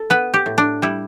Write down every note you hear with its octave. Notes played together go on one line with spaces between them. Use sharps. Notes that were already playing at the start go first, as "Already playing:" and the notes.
Already playing: A4
B3 B4
G4
A2
D4
G3 E4